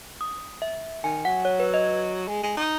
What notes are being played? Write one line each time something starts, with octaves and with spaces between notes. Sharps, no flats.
D#6
E5
D#3 G#5
F#3 F#5
C#5
B4
D#5
G#3
G#3
D#4